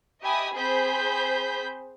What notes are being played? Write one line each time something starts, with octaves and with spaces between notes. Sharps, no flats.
G4 D#5 E5 G#5 B5 D#6
C4 G#4 C5 B5 G6 B6